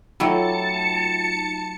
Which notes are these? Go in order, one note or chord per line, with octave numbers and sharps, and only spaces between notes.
F#3 A3 D#4 F4 G5 A5 B5 C#7